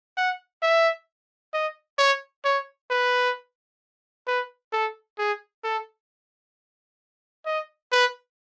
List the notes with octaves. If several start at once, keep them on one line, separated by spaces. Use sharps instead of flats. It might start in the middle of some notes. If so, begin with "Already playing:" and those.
F#5
E5
D#5
C#5
C#5
B4
B4
A4
G#4
A4
D#5
B4